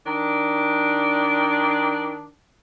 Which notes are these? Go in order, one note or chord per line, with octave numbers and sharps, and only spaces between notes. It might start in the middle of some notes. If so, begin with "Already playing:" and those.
D#3 D4